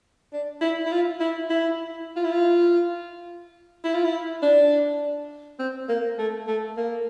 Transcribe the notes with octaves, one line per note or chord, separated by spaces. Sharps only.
D4
E4
E4
F4
E4
E4
F4
E4
F4
E4
F4
E4
D4
C4
A#3
A3
A3
A#3